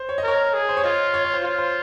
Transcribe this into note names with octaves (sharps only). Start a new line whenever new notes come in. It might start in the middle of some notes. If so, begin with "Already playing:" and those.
Already playing: C5
C#5
D#5
A#4 C#5
G#4
C5
C#5
F4 D#5
C#5
C#5
C5
F4 C#5
C5